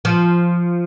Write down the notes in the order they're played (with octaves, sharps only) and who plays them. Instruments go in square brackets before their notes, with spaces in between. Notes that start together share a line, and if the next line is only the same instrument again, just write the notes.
[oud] F3